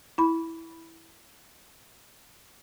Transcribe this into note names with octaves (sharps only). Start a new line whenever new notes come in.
E4 B5